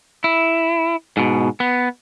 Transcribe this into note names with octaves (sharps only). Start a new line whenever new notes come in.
E4
G#2 B2
B3